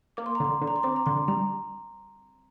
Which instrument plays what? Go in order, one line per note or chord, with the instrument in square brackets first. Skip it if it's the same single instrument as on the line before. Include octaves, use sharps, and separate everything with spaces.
[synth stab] A#3 [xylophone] D6
[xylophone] C6
A#5
[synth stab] D3 [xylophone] C6
[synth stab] D3
[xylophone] A#5
C6
[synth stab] C4 [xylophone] D6
[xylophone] A#5
[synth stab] D3 [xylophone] C6
[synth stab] G3 [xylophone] A#5